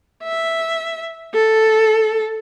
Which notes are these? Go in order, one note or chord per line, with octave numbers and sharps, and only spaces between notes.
E5
A4